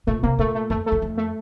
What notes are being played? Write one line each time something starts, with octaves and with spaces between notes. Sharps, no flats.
A#2 A3
C3 A#3
A#2 A3
A3
F2 A3
A3
F2
F2
A3